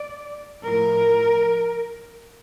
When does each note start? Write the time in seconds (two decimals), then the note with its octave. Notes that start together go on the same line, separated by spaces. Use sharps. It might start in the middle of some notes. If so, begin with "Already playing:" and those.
Already playing: D5
0.67 A2 F3 A#4